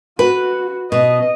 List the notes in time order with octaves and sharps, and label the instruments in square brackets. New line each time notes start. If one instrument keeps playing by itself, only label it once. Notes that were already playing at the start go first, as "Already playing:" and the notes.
[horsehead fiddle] F#4 [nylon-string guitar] B4
[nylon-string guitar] B2 [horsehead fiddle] D#5